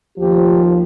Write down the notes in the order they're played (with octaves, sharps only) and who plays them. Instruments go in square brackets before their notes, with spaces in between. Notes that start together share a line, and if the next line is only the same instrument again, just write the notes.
[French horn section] D#2 F3 [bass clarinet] G4